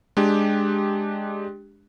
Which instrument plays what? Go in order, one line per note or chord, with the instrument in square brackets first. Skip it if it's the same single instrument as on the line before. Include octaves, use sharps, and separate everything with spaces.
[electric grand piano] G#3 D4 G4